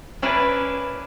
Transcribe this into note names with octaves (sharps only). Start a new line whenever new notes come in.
C#4 D4 E4 A#4 B4